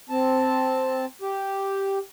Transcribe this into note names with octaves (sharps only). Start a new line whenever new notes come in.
C4 A5
G4